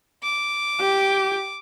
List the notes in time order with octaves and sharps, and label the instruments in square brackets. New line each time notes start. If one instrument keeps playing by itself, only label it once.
[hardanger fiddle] D6
[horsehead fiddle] G4